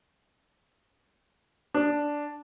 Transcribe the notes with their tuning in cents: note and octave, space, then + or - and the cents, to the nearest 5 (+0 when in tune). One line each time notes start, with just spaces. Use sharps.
D4 -5